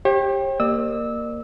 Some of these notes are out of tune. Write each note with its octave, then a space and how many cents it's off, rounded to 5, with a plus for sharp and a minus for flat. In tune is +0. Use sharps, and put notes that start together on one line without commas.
G4 +10 C#5 -45
A#3 +0 D5 +45 E6 -15